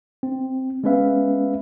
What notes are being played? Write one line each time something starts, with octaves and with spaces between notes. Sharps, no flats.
C4
G#3 B3 C#4 B4 E5 F5